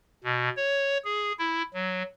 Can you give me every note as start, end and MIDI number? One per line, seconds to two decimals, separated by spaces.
0.24 0.49 47
0.57 0.98 73
1.05 1.32 68
1.39 1.62 64
1.74 2.03 54